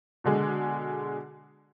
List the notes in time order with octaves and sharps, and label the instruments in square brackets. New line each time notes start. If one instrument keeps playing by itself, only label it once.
[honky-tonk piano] B2 D3 G#3